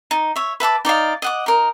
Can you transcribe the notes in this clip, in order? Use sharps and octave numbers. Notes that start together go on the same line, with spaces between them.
D#4
C#5 E5
B4 E5 A5 D6
D#4 D5 D#5 F5
D#5 F#5 D6
D#4 A#4